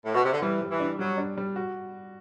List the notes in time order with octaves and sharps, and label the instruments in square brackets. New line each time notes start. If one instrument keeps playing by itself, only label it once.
[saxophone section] A2
B2
C3
D3
[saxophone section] E3 [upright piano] G3
[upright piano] G3
[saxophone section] E3
[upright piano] D4
[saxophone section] F#3 [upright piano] G3
[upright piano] D4
G3
F#4